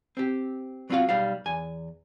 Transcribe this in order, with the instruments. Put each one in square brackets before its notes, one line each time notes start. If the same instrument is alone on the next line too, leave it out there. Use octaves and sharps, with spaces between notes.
[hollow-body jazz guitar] C4 G4
F#3 C4 C#4 F4 F#4 F5
B1 G3 F5
E2 G#5